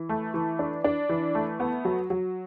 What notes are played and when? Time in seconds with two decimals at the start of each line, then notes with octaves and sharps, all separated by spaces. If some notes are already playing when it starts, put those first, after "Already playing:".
Already playing: E3
0.09 A3
0.34 E3
0.59 D4
0.84 D4
1.09 E3
1.35 A3
1.60 B3
1.85 F#3
2.10 F#3